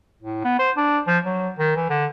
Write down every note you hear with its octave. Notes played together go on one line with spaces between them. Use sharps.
A2
B3
C5
D4
F3
F#3
D#3
E3
D3